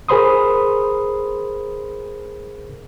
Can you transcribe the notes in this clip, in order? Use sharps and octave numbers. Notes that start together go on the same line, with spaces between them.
G#4 A#4 C5 B5 C6 D#6